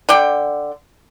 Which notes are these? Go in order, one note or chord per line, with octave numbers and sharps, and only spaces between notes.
D3 D5 G5